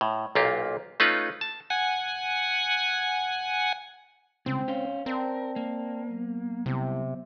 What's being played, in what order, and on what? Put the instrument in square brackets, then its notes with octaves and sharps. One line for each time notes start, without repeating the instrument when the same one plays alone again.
[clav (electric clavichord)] A2
B1 A#2 A#3 F4 G4
A3 C#4 D#4 F4 B4
A5
[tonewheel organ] F#5 G#5
[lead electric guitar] C2 C#3 [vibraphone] G#3 [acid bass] C4
[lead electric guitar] C#4 C5 [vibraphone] C#5 F5
[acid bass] C4 [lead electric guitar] A#4 [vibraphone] D5 A5
[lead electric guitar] A#3
[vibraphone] F#3 B3
[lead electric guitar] C2 [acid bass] C3